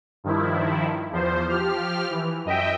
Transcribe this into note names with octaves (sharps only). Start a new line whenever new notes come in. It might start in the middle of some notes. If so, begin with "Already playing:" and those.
G2 D#3 F3 E4
E2 F3 C5
F3 G4 F6
E3
F#2 D#5 E5 G5